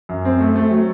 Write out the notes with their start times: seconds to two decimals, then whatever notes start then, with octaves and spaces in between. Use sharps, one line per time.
0.09 F#2
0.25 C4
0.40 A3
0.56 A3
0.71 F#3